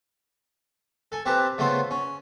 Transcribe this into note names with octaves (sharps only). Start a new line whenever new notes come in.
A4 G#5
C4 G4 B4 A5 A#5
C#3 A3 B3 F4 C5
C#4